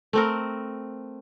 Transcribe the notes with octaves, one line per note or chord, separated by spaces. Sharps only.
A3 C4 A#4